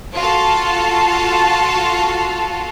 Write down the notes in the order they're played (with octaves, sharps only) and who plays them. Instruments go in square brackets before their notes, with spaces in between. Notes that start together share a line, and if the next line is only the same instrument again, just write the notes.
[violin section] F4 F#4 A4 F5 A5